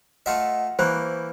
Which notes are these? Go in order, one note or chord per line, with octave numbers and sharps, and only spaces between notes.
A3 F4 D#5 E5 F#5
E3 A#3 C5 B5 C#6 G6